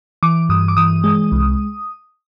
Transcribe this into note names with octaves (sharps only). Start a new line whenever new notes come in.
E3 D6
G2 D#6
D6
E3 D#6
G#3
C2